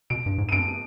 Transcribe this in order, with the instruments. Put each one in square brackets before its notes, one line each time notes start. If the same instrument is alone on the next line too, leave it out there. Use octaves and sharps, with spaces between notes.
[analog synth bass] B2 [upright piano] D7
[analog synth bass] G2
G#2
[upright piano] D#7
[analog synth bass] G2 [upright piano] D7